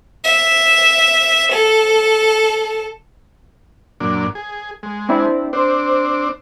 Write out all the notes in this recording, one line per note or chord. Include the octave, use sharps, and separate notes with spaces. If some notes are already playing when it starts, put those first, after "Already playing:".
E5
A4
F#2 A#2 D4
G#4
G#3
C4 D4 E4
C4 D4 C5